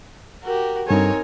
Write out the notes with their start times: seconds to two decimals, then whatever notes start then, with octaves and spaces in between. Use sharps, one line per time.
0.44 F#4 G4 A#4
0.88 G2 C4 D#4 A4 A#4 C#5 G#5